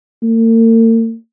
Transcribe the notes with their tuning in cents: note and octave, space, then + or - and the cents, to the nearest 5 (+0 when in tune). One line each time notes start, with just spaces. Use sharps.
A#3 -45